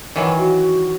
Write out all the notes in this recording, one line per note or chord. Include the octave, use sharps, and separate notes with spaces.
D#3 E3 F#3
F#4